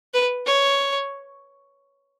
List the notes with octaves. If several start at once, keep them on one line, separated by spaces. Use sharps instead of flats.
B4
C#5